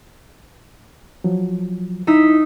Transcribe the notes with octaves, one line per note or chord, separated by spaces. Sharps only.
F3 F#3
D#4 E4 E6 B6